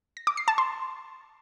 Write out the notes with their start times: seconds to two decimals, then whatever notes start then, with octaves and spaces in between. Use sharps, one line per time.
0.17 A#6
0.27 D6
0.37 C7
0.48 A5
0.58 C6